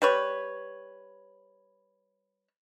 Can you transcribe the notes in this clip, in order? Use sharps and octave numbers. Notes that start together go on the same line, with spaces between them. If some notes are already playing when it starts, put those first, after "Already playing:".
G3 B4 C#5